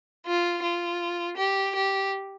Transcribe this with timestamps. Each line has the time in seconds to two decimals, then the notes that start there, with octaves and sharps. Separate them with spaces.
0.27 F4
0.63 F4
1.37 G4
1.75 G4